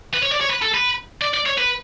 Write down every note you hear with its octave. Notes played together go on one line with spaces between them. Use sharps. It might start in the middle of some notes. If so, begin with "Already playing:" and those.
B4
C#5
D5
C#5
B4
A4
B4
D5
D5
C#5
B4